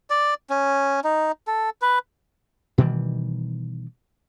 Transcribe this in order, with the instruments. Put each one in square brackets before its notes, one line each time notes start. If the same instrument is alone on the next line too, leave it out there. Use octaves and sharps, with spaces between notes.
[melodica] D5
C#4
D#4
A4
B4
[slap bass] B2 D#3 E3 G3